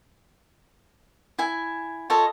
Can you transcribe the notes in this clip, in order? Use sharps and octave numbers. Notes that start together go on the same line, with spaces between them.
E4 G#5
F4 A4 C#5 D#5